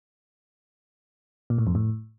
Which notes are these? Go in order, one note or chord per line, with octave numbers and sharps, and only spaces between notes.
A#2
A2
F2
A2